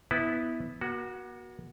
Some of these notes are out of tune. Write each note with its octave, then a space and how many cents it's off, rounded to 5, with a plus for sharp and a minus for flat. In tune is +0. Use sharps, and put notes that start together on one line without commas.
B3 +0 E4 -20 B4 +5
A#3 +45 F#4 +0